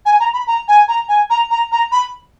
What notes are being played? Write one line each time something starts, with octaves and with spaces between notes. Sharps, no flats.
G#5
A#5
B5
A#5
G#5
A#5
G#5
A#5
A#5
A#5
B5